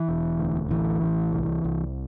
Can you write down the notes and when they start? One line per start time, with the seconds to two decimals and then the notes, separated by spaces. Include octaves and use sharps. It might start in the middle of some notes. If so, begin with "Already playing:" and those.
Already playing: E3
0.08 E1
0.39 D2
0.71 A1 E3
1.02 A1
1.32 C2
1.64 C2